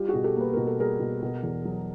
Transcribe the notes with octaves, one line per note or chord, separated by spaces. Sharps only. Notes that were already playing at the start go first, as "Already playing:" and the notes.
Already playing: G3 F4 G4
B2 F#4 G#4
G4 A4
A#3 B4
B2 A#4
A4
G3 G#4 A#4
B2
B2
E2
F#3